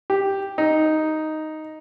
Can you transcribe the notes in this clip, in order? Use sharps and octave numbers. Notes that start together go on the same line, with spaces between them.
G4
D#4